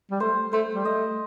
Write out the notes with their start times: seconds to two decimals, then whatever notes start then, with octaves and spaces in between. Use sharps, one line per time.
0.11 G3
0.20 A3 C5
0.53 A3 C5
0.75 G3
0.85 A3 D#5